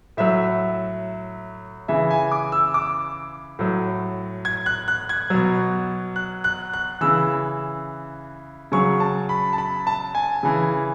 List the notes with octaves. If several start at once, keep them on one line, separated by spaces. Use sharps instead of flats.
A2 F#3 E5
C#3 E3 E5
G#5
D6
E6
D6
A2 F#3
G#6
F#6
F#6
G#6
B2 F#3
F#6
F#6
F#6
C#3 E3 E6
C#3 F#3 C#6
A5
B5
A5
B5
A5
G#5
C#3 E3